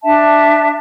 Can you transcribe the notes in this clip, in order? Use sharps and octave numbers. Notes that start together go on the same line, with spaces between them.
D4 E5 A5